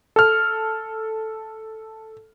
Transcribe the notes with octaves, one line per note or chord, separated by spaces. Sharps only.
A4 F6